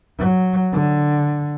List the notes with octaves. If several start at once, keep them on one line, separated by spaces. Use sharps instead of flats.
F#3
D3